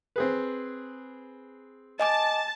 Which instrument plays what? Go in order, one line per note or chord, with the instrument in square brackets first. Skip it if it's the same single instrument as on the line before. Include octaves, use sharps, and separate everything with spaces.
[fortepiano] C4 G#4 B4
[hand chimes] D#5 G#5 D6 [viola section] A5